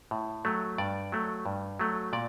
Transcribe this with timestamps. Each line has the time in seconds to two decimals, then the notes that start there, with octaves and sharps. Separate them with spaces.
0.11 A2
0.45 F#3 A3
0.78 G2 D5
1.12 F#3 A3
1.46 G2
1.80 F#3 A3
2.13 A#2 D5